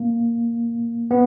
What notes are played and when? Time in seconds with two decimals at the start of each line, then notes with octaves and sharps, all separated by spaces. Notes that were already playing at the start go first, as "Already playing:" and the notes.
Already playing: A#3
1.11 B3